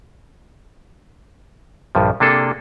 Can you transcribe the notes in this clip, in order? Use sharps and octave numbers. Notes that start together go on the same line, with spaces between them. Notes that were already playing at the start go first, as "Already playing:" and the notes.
A#1 G2 F3
C3 A#3 D4 G#4 A4